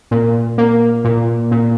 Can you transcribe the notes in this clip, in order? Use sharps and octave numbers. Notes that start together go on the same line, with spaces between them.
A#2
A#3
A#2
A#2